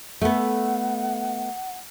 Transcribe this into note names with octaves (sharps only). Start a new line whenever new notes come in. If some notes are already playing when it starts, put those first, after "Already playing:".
A3 B3 F#5